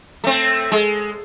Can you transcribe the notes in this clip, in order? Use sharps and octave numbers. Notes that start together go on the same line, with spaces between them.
A3 C4
G#3